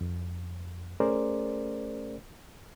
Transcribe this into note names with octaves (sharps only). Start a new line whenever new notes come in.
F2
A3 C#4 G#4 A#4 C5 D5